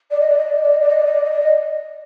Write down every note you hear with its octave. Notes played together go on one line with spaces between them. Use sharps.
D5
D#5
D5
D#5
D5
D#5
D5
D#5
D5
D#5
D5
D#5
D5
D#5
D5
D#5